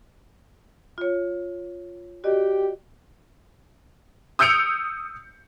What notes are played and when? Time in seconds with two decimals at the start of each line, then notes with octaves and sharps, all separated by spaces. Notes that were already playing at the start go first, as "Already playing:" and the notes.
0.98 F4 C#5
2.24 F#4 G4 D5 D#5
4.39 D#6 E6 G6 C#7 D7 F7